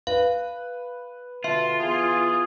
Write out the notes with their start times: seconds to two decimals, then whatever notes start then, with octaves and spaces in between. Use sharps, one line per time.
0.07 B4 F5
1.44 B2 D3 F4 E5 A5
1.79 E3 B3 G#4